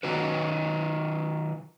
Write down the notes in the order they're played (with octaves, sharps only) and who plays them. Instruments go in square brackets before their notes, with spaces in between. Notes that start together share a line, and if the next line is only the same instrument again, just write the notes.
[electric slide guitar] D#3 F#3 D#4 F#4 B4